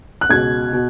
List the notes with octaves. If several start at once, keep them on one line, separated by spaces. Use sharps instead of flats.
F#6
C#2 B2 G#6
B2